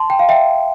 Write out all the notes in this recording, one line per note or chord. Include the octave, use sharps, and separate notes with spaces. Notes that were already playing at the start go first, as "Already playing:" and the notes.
Already playing: A5 C6
G5
F5
E5 G5